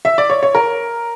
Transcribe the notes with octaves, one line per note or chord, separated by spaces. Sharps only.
E5
D5
C#5
C#5
A#4